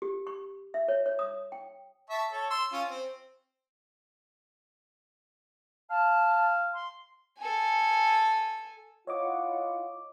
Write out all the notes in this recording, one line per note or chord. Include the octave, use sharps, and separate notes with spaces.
G4
C#6
E5
C#5
C#5
D#6
G5
E5 A5 C#6
A4 C#5
C6 E6
C#4 F4
C4
F5 A5
C6
A4 G#5
E4 F4 C#5 D#5 F#5 D6